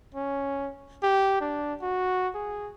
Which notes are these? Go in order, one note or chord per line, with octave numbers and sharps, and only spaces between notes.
C#4
G4
D4
F#4
G#4